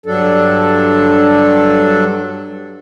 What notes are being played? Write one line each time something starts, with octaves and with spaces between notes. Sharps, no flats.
G2 F#3 D4 A4